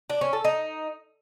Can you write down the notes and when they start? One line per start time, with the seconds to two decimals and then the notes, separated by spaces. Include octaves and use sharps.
0.10 D4
0.21 C#4
0.33 A4
0.44 D#4